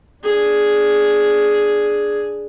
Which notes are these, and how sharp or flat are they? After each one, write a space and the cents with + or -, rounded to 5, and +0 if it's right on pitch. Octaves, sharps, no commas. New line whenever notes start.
D4 +0 G#4 +0